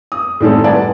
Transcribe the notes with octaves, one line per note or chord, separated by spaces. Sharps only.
D#6
A2 D#3 G3 G#3 C4 A4
B4 D5 F#5 G#5 A5